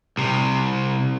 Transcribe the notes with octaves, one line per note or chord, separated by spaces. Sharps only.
C2 C3